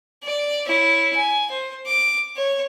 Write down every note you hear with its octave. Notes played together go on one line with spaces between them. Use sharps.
D5
E4 C#5
G#5
C5
D6
C#5